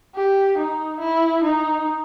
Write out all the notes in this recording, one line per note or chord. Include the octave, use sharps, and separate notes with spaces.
G4
D#4
E4
D#4